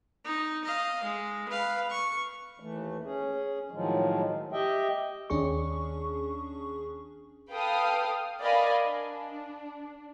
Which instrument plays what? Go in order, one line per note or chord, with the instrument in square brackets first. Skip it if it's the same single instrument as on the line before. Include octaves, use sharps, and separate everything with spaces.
[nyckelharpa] D#4
D#5 F5
G#3
B4 F5
C#6
[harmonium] D#2 E3 A3
C#4 G#4
A2 D#3 F3 F#3 G#3
G4 D#5 E5 G5
[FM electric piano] D#2 C#4 D4 G#4 C#6
[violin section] A4 B4 F5 G5 D#6
A#4 D5 D#5 F5 G#5 B5
D4